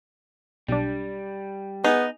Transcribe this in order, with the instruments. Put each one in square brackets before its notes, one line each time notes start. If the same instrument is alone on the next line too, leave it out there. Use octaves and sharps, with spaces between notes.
[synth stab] B1 D4 [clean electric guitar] G3
[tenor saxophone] B3 [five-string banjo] D#4 [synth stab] G#4